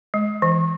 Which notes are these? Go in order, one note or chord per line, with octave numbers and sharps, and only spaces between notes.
G#3
E3